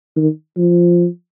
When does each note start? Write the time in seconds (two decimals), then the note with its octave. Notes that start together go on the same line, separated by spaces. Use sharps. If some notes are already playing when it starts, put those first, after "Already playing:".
0.16 D#3
0.57 F3